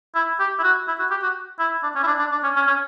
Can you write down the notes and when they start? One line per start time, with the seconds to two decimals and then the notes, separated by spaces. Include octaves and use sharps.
0.15 E4
0.39 G4
0.59 E4
0.63 F#4
0.88 E4
0.99 F#4
1.11 G4
1.23 F#4
1.59 E4
1.83 D4
1.95 C#4
2.03 E4
2.07 D4
2.19 D4
2.32 D4
2.43 C#4
2.56 C#4
2.67 C#4